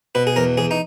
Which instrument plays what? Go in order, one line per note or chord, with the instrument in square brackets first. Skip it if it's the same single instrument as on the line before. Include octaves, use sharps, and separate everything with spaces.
[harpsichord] B2 B4
G#4
E2 A#4
E2 G#4
D#4